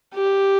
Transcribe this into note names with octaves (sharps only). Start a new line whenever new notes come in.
G4